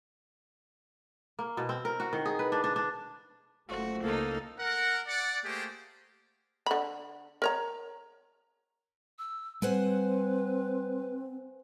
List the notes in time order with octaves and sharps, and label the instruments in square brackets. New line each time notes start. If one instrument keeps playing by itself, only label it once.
[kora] A#3
B2
C4
A#4
F#4
D#3
G#4
B4
D4
D4
D4
[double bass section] F#1 A3 [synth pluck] F4 C5 [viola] F#4
[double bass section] C#2 [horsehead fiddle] A#3 [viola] D#4 A4
[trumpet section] A#4 F#5
D5 F#5
A3 A#3 G4 G#4 C5
[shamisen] D3 B5
A#4 C#5 A#5
[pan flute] E6
[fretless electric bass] G3 [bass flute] C4 [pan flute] B4 [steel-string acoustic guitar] C5 F#5 G#5